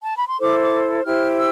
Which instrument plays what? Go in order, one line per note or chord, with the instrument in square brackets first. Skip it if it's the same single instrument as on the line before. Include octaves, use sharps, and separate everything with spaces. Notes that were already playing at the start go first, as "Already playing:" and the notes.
[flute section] A5
B5
C6
E4 A4 C5 D6
D6
E4 G4 C5 F6
E6